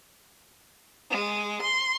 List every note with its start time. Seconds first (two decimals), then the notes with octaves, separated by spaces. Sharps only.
1.09 G#3
1.61 C6